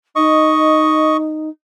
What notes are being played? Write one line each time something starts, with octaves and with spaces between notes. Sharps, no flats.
D#4 D#5 C#6